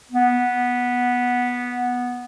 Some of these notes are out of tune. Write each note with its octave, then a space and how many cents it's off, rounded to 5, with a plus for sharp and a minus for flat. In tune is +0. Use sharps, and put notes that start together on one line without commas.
B3 -10